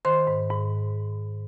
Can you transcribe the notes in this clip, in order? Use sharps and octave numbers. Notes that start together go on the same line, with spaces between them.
D#3 C5 C6
G#2
G#2